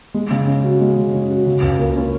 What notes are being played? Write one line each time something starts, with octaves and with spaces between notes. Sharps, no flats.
G#3
C#3
C#4
F#4
G#3
C#3
C#4
F#4
C#3
C#2
A#3
C#4